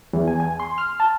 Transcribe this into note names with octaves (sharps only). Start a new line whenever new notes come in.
E2
G#5
G#5
C6
F6
A5